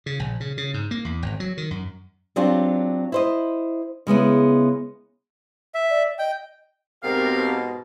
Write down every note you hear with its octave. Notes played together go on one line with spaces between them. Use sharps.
C#3
A#1
C#3
C#3
G#2
A#3
E2
G#1
F#3
D#3
F#2
F#3 C4 D4 F4 G4
E4 C5 D#5
C#3 G#3 B3 E4
E5
D5
D#5 G5
G#2 B2 C4 G4 A#4 F5